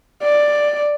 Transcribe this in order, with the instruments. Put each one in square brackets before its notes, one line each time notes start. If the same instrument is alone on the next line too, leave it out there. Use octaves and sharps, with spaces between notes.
[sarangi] D5